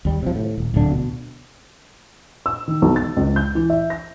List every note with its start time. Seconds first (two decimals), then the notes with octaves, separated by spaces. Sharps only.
0.05 D#2 G3
0.22 C3 F3
0.35 A2
0.58 D#1
0.74 D1 A#1 D3 D4
0.91 B2
2.46 E6
2.68 D#3
2.82 B1
2.96 A6
3.17 C#2
3.36 G6
3.55 E3
3.70 E5
3.90 A#6